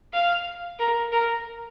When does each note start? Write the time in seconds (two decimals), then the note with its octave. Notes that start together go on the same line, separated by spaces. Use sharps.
0.13 F5
0.79 A#4
1.12 A#4